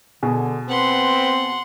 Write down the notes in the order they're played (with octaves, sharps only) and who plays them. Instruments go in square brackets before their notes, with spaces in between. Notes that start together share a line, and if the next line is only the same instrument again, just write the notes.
[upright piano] B2 G#4 [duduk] D3
[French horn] C4 [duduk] B4 [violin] F#5 C6